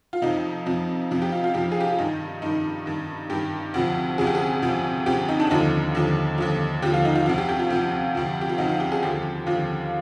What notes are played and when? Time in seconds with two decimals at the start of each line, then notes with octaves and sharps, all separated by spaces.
0.13 F4
0.22 F2 C3 F3 D#4
0.66 F2 C3 F3
1.11 F2 C3 F3
1.22 G4
1.32 F4
1.44 F4
1.54 F2 C3 F3 G4
1.72 G#4
1.80 G4
1.90 F4
1.99 G2 D#3 D#4
2.42 G2 D#3 D#4
2.86 G2 D#3
3.30 G2 D#3 G4
3.74 D2 C3 F3
4.18 D2 C3 F3 G#4
4.27 G4
4.35 G#4
4.62 D2 C3 F3
5.06 D2 C3 F3 G4
5.29 D#4
5.40 D4
5.50 D#2 D3 F3 D#4
5.95 D#2 D3 F3
6.38 D#2 D3 F3
6.82 D#2 D3 F3 G4
6.94 F4
7.05 D#4
7.15 F4
7.26 D2 C3 F3 F4
7.38 G4
7.49 G4
7.59 F4
7.70 D2 C3 F3
8.15 D2 C3 F3
8.41 G4
8.49 F4
8.58 D2 C3 F3 D#4
8.69 F4
8.80 G4
8.92 G#4
9.02 D#2 D3 F3 G4
9.47 D#2 D3 F3 F4